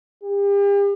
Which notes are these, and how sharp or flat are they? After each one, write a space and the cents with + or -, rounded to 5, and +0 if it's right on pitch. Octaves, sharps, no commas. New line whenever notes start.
G4 +40